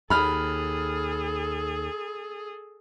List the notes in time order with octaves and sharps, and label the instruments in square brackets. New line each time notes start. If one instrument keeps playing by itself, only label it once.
[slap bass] D#2 [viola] G#4 A4 [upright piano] B5 F6